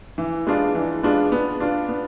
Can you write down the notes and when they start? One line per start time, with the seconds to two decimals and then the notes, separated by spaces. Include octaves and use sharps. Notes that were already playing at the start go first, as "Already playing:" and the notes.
0.18 E3
0.47 G#3 B3 D4 F4
0.75 E3
1.03 G#3 B3 D4 F4
1.32 B3
1.60 D4 F4
1.89 B3